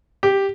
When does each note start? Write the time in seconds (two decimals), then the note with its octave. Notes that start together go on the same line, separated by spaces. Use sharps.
0.23 G4